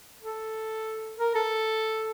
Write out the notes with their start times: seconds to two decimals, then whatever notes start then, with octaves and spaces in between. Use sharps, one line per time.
0.23 A4
1.18 A#4
1.35 A4